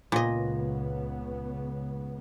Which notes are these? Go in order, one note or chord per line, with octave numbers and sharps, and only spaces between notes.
C#2 A#2 C#3 B3 D#5